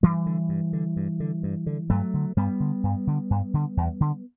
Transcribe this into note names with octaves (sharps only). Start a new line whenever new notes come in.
G2 E3 G3
D3
G2
D3
G2
D3
G2
D3
G2 F#3 A3
D3
G2 G3 B3
D3
G2
D3
G2
D3
E2
D3